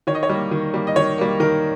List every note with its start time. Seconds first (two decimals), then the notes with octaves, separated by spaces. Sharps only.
0.07 D#3 C#5
0.15 D#5
0.23 C#5
0.29 G3 A#3
0.51 D#3
0.74 G3 A#3
0.87 D#5
0.96 D#3 C#5
1.18 G3 A#3
1.40 D#3 A#4